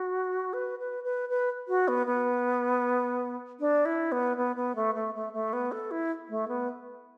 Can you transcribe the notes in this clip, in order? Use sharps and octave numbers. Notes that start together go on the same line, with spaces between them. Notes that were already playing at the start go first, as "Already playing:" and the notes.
Already playing: F#4
B4
B4
B4
B4
F#4
B3
B3
D4
E4
B3
B3
B3
A3
A3
A3
A3
B3
A4
E4
A3
B3